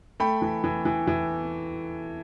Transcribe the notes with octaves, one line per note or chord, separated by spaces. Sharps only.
A3 G5 B5
E3
E3
E3
E3